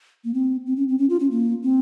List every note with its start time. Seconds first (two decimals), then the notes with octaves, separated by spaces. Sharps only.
0.25 A#3
0.34 C4
0.66 C4
0.77 C#4
0.88 C4
0.98 C#4
1.10 F4
1.20 C#4
1.31 A#3
1.63 C4